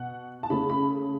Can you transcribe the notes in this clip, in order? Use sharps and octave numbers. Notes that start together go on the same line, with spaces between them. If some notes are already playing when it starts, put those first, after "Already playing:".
Already playing: B2 F#5
A5
C#3 A3 C#4 B5
B5